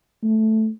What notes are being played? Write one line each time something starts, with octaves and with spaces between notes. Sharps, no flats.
A3